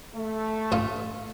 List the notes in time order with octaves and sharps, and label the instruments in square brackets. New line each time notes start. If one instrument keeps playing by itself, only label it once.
[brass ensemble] A3
[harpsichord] A1 F4 D#6